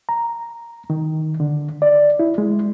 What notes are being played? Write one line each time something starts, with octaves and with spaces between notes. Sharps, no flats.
A#5
D#3
D3
D5
E4
G#3